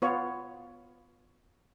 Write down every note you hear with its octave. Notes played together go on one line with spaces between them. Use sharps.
B3 F4 C#5